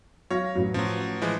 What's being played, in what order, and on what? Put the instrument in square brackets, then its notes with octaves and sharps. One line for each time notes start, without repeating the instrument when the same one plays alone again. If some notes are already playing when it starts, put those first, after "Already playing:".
[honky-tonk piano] F#3 F5 A#6 [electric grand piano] C#5
[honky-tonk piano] A1 F#3
[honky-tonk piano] A1 [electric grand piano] F3 F#3
[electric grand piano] E3 F3 G#3